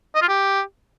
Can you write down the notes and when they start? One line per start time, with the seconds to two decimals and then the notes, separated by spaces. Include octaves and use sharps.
0.15 D#5
0.22 F4
0.29 G4